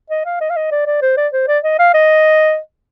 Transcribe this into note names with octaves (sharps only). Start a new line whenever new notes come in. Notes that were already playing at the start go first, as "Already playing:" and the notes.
D#5
F5
D#5
F5
D#5
D5
D5
C5
D5
C5
D5
D#5
F5
D#5